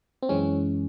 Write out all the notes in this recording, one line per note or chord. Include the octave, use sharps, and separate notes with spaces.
C4
F#2 E3 G#3 C#4